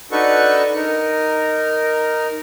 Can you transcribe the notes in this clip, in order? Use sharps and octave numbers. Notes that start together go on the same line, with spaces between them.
D4 D#4 F#4 A4 B4 C#6
D#4 A#4